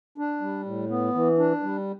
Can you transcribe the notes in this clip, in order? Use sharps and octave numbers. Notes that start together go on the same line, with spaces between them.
D4
G3
A2
B3
E3
D4
G3